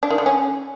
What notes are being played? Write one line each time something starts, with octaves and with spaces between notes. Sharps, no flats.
D4
D#3
D3
C#4